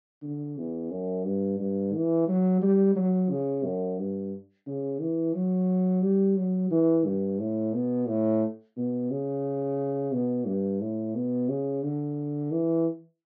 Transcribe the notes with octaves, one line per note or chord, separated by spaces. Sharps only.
D3
E2
F#2
G2
G2
E3
F#3
G3
F#3
C#3
F#2
G2
C#3
E3
F#3
G3
F#3
E3
G2
A2
B2
A2
B2
C#3
B2
G2
A2
B2
C#3
D3
E3